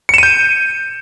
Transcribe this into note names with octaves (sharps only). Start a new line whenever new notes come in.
G6 C#7 D#7 E7